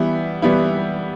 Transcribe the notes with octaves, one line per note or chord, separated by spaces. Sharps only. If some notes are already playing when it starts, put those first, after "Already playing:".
Already playing: E3 G3 B3 E4
E3 G3 B3 E4